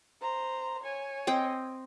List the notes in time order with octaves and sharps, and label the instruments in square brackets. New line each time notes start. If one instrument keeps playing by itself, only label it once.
[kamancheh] C5 A#5
C#5 G#5
[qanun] C4 D#5 G5